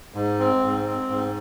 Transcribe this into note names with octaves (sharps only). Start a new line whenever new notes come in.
G#2
C4
G#2
C4
G#2